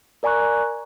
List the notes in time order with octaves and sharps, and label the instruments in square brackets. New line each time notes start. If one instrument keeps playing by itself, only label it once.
[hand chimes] A#4 D5 G#5 A#5 C#6 F#6